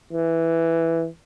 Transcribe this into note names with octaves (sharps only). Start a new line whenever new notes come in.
E3